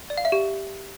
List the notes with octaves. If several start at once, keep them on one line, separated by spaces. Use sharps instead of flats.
D5
F5
E5
G4